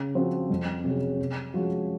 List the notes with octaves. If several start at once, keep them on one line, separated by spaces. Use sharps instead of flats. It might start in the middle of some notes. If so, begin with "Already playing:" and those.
Already playing: C#3
F3 C4 F#4 C5
F2
C3 F#3 C#4 G#4
C3
F3 G#3 C#4 F#4